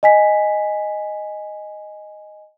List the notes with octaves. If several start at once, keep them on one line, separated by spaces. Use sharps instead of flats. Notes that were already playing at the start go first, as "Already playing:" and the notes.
D#5 G#5 B6